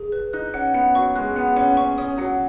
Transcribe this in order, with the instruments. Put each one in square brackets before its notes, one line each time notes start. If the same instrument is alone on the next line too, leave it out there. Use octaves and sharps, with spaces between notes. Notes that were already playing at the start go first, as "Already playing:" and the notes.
Already playing: [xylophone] G#4
B4
[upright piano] D#4 [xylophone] F#6
[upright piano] C#4 [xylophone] F#5
[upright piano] B3 [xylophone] F#5
[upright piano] F#3 [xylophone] C#6
[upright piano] G#3 [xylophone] F#6
[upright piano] B3 [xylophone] F#5
[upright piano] C#4 [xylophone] F#5
[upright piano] C#4 [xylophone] C#6
[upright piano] C#4 [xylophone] D#6
[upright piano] F#3 [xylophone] F#5